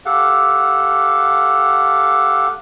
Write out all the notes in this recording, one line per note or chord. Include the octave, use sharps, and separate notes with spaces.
G4 A4 F5 F#5